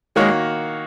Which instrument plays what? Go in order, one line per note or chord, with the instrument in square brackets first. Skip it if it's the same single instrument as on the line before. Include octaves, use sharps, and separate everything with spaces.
[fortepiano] D#3 A#3 F#4 C#5 [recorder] G#3